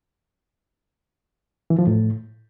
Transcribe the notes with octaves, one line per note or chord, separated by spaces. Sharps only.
E3
F3
A2